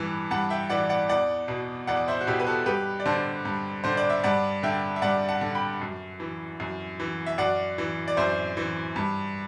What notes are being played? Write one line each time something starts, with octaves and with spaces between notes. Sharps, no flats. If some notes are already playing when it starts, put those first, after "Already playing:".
Already playing: G2 E3
G2 F#5 A5
E5 G5
E3 D5 F#5
D5 F#5
E2 D5 F#5
B2
E2 D5 F#5
C5 E5
F#4
B2 E4 G4
B4
F#4 A4
G2 G4 B4
D5
D3 A4 C5
G2
D3 C5
D5
E5
G2 D5 F#5
D3 E5 G5
E5
G2 D5 F#5
F#5 A5
D3
G5 B5
F#2
E3
F#2
E3
E5
F#2 D5 F#5
E3
D5
F#2 C5 E5
E3
G2